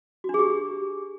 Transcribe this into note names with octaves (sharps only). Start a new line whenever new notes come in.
F#4
D4
G#4
G4